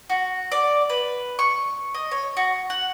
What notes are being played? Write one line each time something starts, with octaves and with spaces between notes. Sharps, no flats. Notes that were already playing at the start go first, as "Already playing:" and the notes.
F#4
D5
B4
C#6
D#5
C#5
F#4
F#5